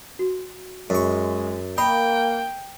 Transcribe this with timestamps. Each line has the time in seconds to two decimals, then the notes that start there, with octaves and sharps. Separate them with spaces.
0.19 F#4
0.90 F#2 G#3 C#6
1.78 A#3 D#5 G5 B5